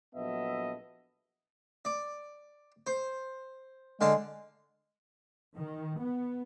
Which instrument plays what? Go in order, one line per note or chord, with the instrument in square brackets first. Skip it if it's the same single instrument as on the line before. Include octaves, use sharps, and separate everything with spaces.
[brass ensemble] A#1 F#3 B3 A4 D#5 E5
[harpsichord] D5
C5
[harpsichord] D3 F5 A5 [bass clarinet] G#3
[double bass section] D#3
B3